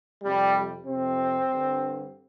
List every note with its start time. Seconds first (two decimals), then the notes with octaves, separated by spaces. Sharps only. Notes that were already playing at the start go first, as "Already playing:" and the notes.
0.23 F2 C3 G3
0.86 F2 C3 C4
1.50 G2 D3